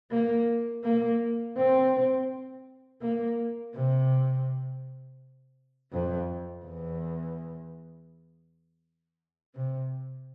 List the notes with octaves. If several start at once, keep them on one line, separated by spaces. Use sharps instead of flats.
A#3
A#3
C4
A#3
C3
F2
E2
C3